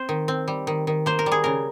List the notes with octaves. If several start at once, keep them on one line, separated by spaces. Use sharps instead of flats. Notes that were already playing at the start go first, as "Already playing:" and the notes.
Already playing: C4 C5
D#3
C4
G3
D#3
D#3
A#3 C5
A#4
G3
G#4
C#3 A#4